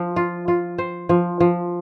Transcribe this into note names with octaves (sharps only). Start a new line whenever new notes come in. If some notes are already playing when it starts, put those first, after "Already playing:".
Already playing: F3
F4
F4
C5
F3
F3